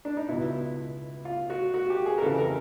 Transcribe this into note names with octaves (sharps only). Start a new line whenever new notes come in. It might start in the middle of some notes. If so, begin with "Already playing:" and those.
D4
D#4
C#2 B2 E4
F4
F#4
F#4
G4
G#4
A#4
F2 C#3 E3 A4
A#4